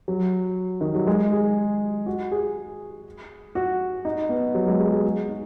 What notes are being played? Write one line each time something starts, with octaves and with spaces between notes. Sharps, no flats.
F#3
D#3
F#3
G#3
G#4
F#4
G#4
F#4
D#4
B3
F#3
G#3
G#4
G#4
F#4
D#4